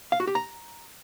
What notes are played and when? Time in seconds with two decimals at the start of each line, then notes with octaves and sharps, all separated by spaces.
0.12 F5
0.20 F#4
0.27 G4
0.35 A#5